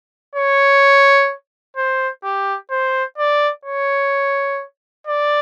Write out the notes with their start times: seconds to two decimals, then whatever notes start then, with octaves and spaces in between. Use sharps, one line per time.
0.35 C#5
1.77 C5
2.24 G4
2.71 C5
3.18 D5
3.65 C#5
5.07 D5